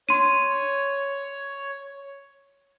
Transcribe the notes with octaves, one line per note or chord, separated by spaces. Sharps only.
C#5 C6 D#7